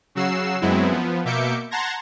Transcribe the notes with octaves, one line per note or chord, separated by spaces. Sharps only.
C#3 F#3 F#4 E6 C7 E7
F#2 F#3 G#3 B3 C4 E4
F3 B3
B2 A#3 E5 D6 G6 C#7
F#5 A5 A#5 C6 G#6 A#6